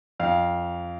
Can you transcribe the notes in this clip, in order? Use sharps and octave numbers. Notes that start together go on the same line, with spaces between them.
F2 F5